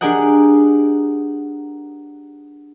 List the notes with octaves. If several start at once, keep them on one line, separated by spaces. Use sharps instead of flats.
D4 G4 G#4 A#4 D#5 F#5